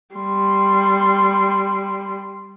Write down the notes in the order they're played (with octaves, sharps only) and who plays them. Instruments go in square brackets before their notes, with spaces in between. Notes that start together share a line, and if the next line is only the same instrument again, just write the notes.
[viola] G3 C6